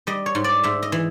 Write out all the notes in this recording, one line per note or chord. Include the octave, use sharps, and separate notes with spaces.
G3 D#5
C#5
G#2
D5
G#2 E5
D#5
E3